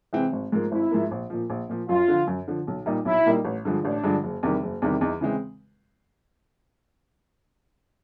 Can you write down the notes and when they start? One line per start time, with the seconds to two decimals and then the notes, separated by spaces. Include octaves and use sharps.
0.13 C3 E3 G#3 C4
0.33 G#1
0.52 G#2 F3 A#3
0.71 G#1 E4
0.91 G#2 F3 A#3
1.11 A#1
1.30 A#2 F3
1.50 A#1
1.69 A#2 F3
1.88 F#2 F4
2.08 D3 F3
2.27 F#2
2.48 D3 F3
2.68 B1
2.86 A#2 G3 A#3 D#4
3.05 B1 E4
3.26 A#2 G3 A#3 D#4
3.45 A1
3.65 G2 D3 F3 G#3
3.84 A1 D4
4.04 G2 D3 F3 G#3
4.24 F#1
4.43 E2 C3 D#3 G3
4.63 F#1
4.82 E2 C3 D#3 G3
5.01 E2 D#4
5.21 C#3 E3 G#3 C4